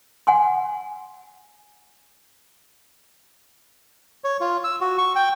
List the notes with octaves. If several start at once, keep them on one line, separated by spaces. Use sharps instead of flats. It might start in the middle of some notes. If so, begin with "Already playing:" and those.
F#5 G#5 C6
C#5
F4
E6
F#4
C#6
G5